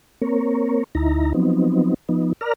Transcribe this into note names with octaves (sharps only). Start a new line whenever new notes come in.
A#3 C4 A#4 C#5
D2 D#4 E4 A#5
F3 F#3 B3 C4 D#4
F3 B3 D#4
A#4 D5 A#5 F6